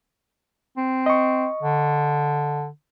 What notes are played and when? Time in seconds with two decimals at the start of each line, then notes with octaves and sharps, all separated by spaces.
0.77 C4
1.06 D#5 C#6
1.63 D3